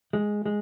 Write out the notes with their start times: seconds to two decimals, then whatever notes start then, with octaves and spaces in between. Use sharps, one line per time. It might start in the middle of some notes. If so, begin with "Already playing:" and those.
0.13 G#3
0.46 G#3